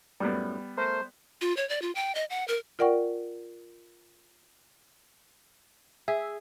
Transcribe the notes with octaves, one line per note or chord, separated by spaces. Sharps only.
F#2 A2 G3 B3
A3 A#4 C5
F4
C#5
D5
F4
G5
D#5
F#5
A#4
F4 A#4 D5 F#5 G5 C#6
G#4 E5